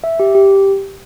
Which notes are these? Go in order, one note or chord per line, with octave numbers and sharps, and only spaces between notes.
E5
G4
G4